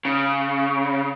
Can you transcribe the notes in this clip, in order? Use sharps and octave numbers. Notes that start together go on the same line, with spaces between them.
C#3